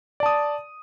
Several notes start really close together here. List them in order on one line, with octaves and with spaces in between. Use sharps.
D5 A5 D#6